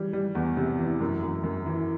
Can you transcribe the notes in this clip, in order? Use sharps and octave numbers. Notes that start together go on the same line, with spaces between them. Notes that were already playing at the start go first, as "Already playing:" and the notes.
Already playing: E3 G3
G3
E2
C3
E3
F#2
F#2
F#2
E3